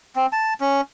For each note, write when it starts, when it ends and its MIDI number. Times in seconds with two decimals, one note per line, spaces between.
0.16 0.26 60
0.33 0.54 81
0.60 0.81 61